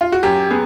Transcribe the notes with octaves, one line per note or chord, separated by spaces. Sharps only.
F4
F#4
F#2 G4
B3 G#4